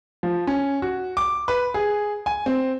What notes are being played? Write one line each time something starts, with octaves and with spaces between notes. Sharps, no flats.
F3
C#4
F#4
D6
B4
G#4
G#5
C4